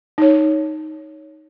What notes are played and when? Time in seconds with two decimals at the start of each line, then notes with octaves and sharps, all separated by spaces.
0.18 D#4 C#5